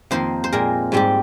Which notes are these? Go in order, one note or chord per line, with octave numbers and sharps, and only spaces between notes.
F2 D#3 A#3 C5
C5
A#2 G#3 C4 A#4
G#2 G3 C4 G4